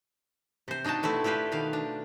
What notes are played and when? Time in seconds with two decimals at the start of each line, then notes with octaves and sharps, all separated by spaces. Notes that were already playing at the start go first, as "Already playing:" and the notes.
0.68 C3 C5
0.84 D4 D#4 F#4 G5 A5
1.03 B2 A3 C4 E4
1.24 E4 F4 G4 B4 C5
1.52 B2 D#3 F5
1.73 D4